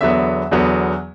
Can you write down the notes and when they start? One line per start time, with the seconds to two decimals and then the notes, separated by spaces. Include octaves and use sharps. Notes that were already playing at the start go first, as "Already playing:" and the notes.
0.01 E2 D3 F#3 B3 E5
0.51 E2 D3 F#3 B3